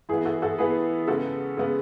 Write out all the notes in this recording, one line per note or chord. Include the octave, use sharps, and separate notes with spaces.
E3 B3 E4 G#4
F#4 A4
F#4 A4
E3 B3 G#4 B4
C#3 G#3 B3 F#4 A4
C#3 G#3 B3